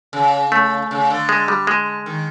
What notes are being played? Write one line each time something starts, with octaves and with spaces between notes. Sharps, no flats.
C#3
A3
C#3
D3
G#3
G3
G#3
D#3